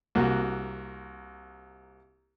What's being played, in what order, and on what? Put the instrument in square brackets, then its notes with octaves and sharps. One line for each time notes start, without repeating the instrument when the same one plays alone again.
[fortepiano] C2 A#3 F#4